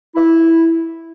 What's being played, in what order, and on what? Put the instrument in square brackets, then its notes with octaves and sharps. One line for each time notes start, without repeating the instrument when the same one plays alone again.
[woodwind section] E4